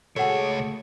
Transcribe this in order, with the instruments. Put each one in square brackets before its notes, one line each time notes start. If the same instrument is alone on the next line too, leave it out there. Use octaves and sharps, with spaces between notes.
[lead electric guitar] C#2 C#5 [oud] A3 G#4 [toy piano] F#4 F#5